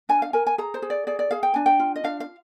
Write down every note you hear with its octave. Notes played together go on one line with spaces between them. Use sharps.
D4 G#5
F5
A#4 G#5
G#5
G#4 A#5
C5
G#4
D5
G#4 D5
D5
G#4 F5
G5
D4 G#5
G5
F4
D#5
D4 F5
F5